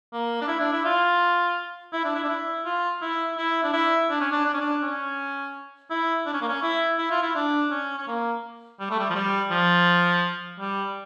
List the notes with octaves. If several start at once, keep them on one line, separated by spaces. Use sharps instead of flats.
A#3
D4
E4
D4
E4
F4
E4
D4
E4
D4
E4
F4
E4
E4
D4
E4
D4
C#4
D4
D4
C#4
D4
C#4
E4
D4
C#4
A#3
C#4
E4
E4
F4
E4
D4
C#4
C#4
A#3
G3
A3
G3
F3
G3
F3
G3